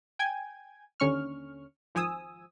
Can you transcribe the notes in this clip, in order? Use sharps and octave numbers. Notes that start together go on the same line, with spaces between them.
G5 G#5 G#6
D#2 D3 C#4 C#6 F6
G#1 F3 G#5 D#6 E6